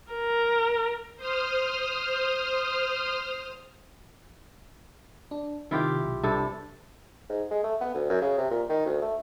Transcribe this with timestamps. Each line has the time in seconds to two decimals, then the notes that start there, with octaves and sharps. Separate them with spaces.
0.12 A#4
1.17 C5 D#6 F6
5.31 D4
5.71 C3 D#3 E4 F4 G4
6.04 B1
6.23 G2 C3 A4
7.29 G#2
7.51 G#3
7.64 A3
7.81 B3
7.94 D2
8.09 F#2
8.21 C#3
8.38 C3
8.50 A#2
8.69 D#3
8.86 D2
9.02 A3